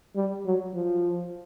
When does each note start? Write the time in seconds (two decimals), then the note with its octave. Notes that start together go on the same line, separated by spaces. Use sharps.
0.16 G3
0.45 F#3
0.74 F3